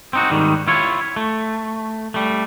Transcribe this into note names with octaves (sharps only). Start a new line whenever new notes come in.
C4 D#4 F#4
G#2 D#3 G3
E4 F4 C#5
A3
G3 A3